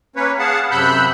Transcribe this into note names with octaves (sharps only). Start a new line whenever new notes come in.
A#3 C#4 B4 C#5
G#4 F5 F#5 A5
F#2 C3 B5 E6 F#6 G6